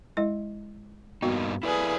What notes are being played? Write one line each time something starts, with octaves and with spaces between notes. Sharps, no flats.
G#3 E4 D#5
G2 A#3 B3 D#4 F#4
E4 G#4 A4 B4 D5